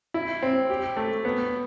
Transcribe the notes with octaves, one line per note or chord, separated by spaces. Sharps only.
E4
C4
G4
A3
B3